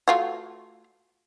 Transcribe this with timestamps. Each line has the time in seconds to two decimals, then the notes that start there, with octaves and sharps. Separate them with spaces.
0.08 A3 F4 F#4